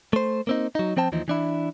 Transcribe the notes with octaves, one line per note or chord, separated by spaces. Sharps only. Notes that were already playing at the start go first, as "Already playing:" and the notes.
A3 C5
A#3 C4 D#4
F#3 D#4
F3 C4 C5 G5 A5
D#2 E3 F3 D#4
E3 D4 E4